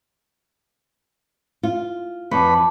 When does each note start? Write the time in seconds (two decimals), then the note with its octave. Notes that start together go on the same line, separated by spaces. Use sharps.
1.63 F4
2.31 F2 B4 C#5 D5 A5